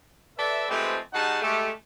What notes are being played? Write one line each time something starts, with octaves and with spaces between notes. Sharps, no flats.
A4 B4 D5 E5
F3 G#3 A3 C4 G4 B4
G3 D#4 F#4 G#4 F#5 A5
G#3 A3 G4